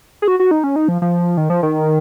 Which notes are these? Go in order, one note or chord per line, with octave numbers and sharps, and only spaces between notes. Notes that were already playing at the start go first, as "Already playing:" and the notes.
G#4
F#4
F#4
D#4
C#4
D#4
F3
F3
D#3
F3
D#3